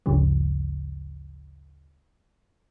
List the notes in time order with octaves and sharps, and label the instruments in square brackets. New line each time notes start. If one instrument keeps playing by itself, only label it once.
[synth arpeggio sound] G#1 D2 G2 C#3 F3 G3